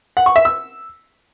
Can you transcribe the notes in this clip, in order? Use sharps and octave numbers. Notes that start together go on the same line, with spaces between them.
F#5
C#6
E5
E6